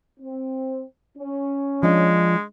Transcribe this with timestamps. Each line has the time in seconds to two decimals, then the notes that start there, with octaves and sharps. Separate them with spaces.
0.20 C4
1.17 C#4
1.83 F3 G#3 D4 D#5